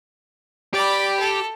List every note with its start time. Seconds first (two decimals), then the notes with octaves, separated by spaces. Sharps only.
0.73 G4 D5 B5
1.20 A4